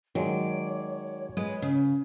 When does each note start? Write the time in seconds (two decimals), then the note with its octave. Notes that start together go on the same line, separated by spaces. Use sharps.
0.15 D#3 F#3 G#3 C#5 D5
1.37 G#3 B4
1.62 C#3